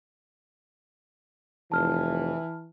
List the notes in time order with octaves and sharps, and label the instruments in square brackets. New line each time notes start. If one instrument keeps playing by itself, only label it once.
[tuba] F1 [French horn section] E3 [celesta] A5 F6